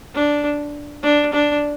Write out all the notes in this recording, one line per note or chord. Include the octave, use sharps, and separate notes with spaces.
D4
D4
D4